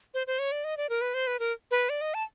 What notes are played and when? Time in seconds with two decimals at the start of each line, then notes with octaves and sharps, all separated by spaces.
0.14 C5
0.27 C5
0.39 C#5
0.52 D5
0.64 D#5
0.77 D5
0.89 A#4
1.01 B4
1.14 C5
1.27 B4
1.39 A#4
1.71 B4
1.89 D5
2.01 D#5
2.14 A5